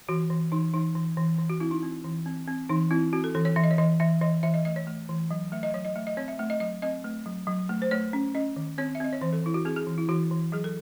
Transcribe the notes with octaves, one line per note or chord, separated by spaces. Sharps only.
E3 F#4
E3
E3 D#4
E3 D#4
E3
E3
E3
F#4
C4 E4
D#4
C4
E3
C4
C4
E3 D#4
C4 E4
C4 F#4
A4
E3 A4
C#5
E3 E5
D#5
C#5
E3 D#5
E3 E5
E3 D#5
E3 E5
D#5
A3 D#5
C#5
A3
E3
F#3
A3 E5
D#5
F#3 C#5
D#5
A3 E5
D#5
C4 C#5
E5
A3 E5
D#5
F#3 D#5
C4 D#5
A3
F#3
F#3
A3
C5
A3 C#5
C#4
C#4 D#5
D#3
C4 C#5
E5
C4 D#5
C#5
E3 C5
A4
E3 E4
F#4
C4 G#4
G#4
E3
E4
E3 F#4
E3
F#3 G#4
A4